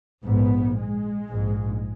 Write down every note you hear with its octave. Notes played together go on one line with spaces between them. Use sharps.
A#1 G#2 B3
G#3
A#1 G#2